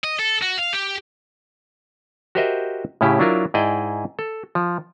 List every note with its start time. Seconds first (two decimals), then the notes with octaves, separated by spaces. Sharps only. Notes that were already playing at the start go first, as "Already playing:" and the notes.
0.04 D#5
0.19 A4
0.42 F#4
0.58 F5
0.73 G4
2.35 F#4 G4 A#4 C5 D#5 E5
3.01 A2 C#3 C#4 E4 G4
3.19 F#3 D4 E4 F4 A#4
3.54 G#2 E4 G#4 D5 D#5 G5
4.19 A4
4.55 F3